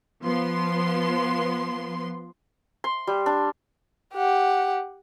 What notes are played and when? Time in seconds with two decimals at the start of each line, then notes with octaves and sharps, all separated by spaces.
0.22 F3 B3 C6
2.84 C6
3.07 G3
3.26 D4
4.14 G4 F#5